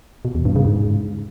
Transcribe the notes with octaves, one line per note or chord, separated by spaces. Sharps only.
B2
E2
G2
C#3
G#2